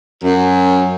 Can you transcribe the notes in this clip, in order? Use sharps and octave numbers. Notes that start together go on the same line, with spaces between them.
F#2